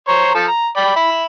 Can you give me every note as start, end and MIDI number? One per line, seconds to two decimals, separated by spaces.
0.08 0.33 72
0.08 0.33 73
0.08 0.33 82
0.35 0.46 53
0.35 0.46 69
0.35 0.46 81
0.48 0.68 82
0.76 0.92 74
0.76 0.92 79
0.76 0.92 83
0.96 1.26 76
0.96 1.26 83